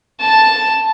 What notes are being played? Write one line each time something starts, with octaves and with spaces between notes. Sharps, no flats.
A5